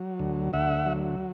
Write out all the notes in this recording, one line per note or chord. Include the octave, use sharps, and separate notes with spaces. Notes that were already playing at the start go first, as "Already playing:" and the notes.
Already playing: F#3
D2
D2 E5 F#5
F#3